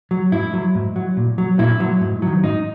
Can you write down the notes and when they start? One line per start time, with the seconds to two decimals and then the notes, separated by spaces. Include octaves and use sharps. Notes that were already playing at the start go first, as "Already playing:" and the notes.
0.11 F#3
0.32 G#2 E4
0.53 F#3
0.75 G#2
0.96 F#3
1.17 A#2
1.38 F#3
1.59 A#2 E4
1.80 F#3
2.01 G#2
2.22 D#3 F#3
2.43 G#2 D#4